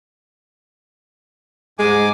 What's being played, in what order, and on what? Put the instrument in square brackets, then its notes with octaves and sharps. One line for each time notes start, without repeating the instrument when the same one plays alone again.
[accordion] G#2 G#5 D6 [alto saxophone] G#3